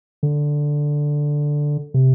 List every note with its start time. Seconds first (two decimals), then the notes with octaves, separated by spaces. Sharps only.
0.23 D3
1.94 C3